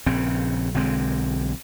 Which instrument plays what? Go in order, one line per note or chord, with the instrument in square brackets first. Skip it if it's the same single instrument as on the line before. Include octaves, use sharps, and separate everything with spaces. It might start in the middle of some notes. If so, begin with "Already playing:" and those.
[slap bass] A#1 C#3 C4
B1 D3 G#3 C4